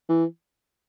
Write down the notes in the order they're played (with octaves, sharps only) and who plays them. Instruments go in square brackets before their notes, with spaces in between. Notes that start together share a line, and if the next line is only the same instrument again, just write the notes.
[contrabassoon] E3